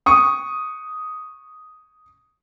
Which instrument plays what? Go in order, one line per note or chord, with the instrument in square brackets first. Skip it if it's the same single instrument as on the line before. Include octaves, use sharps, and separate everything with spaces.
[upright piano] C#6 D#6